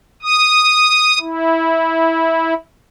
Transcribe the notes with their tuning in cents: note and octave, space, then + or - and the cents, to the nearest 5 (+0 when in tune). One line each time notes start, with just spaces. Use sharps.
D#6 -5
E4 -15